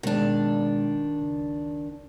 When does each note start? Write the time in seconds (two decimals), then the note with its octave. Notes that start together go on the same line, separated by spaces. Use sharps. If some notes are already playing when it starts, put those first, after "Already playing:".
0.03 B2 D#3 G#3 D4
1.21 C#2